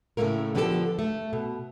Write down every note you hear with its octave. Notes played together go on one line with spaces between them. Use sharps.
A2 C#3 E3 A3 A#3 A#4
D3 F3 B3 G4 A4
A3
B2